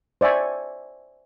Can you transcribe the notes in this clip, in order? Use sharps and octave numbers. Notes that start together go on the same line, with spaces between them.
C5 D5 E5 G#5 C#6